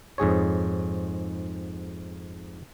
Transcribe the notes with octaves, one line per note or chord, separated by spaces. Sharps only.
F2 G#2 G#4 C#5